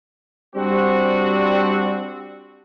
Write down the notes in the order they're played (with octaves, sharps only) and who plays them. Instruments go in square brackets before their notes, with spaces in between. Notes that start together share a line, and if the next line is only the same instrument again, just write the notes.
[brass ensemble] G3 C4 D4 F#4